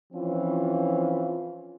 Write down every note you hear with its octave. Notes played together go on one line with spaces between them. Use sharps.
E3 F3 C4 C#4 F4